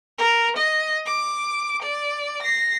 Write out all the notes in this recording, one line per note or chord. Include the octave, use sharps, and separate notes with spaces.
A#4
D#5
D6
D5
A#6 C7